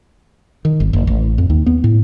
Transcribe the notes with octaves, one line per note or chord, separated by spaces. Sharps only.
D#3
G1
F#1
A1
F2
D#2
B3
A2